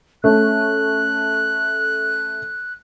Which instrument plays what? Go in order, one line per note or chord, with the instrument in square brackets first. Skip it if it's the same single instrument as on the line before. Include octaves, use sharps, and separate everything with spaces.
[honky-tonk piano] A3 C#4 [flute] F#6